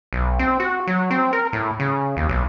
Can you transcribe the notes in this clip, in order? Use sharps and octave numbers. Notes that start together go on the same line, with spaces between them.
B1
C4
F#4
F#3
C4
A#4
A2
C#3
D#2
B1